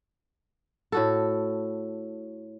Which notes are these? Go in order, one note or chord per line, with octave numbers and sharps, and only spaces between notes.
A2 F#4 A4